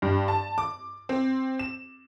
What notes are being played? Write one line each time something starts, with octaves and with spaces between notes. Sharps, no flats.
G2
A5
D6
C4
E7